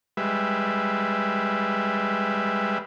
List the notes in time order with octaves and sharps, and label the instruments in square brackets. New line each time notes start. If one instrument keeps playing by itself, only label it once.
[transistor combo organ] G3 G#3 B4 E5